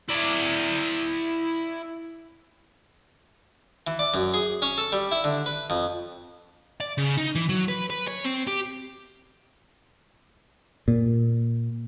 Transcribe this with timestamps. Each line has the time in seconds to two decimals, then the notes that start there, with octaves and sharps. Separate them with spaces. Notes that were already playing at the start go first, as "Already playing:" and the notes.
0.09 E4 D5
3.87 E3
3.99 D5
4.14 F#2
4.34 G#4
4.62 C#4
4.78 A4
4.92 G3
5.12 E4
5.24 D3
5.46 B4
5.70 F2
6.80 D5
6.98 C#3
7.18 D#4
7.35 E3
7.49 F#3
7.68 B4
7.90 B4
8.08 C#5
8.25 C4
8.47 G4
10.88 A#2